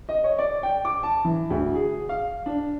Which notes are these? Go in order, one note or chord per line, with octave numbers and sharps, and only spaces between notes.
D#5
C#5
D5
G5
D6
A5
E3
D2
G#4
F5
D4